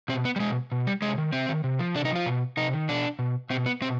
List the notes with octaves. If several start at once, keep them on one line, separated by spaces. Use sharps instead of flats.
B2 C4
B3
G3
B2 G#3
B2
G3
C3 G#3
D#3
C3 C4
D#3
C3
F3
C3 D4
D#4
F3 F4
B2
C3 D#4
D#3
B2 D4
B2
B2 C4
B3
B2 C4